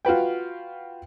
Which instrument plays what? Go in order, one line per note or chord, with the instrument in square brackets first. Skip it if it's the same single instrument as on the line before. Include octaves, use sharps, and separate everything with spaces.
[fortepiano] F4 F#4 B4 G5